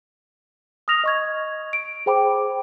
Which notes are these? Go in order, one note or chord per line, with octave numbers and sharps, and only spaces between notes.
D#6 F6 A#6 F7
D#5 C#6 G#6
D7
G#4 C5 G5 B5 D6